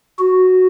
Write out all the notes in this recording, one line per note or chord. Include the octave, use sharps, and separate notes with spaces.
F#4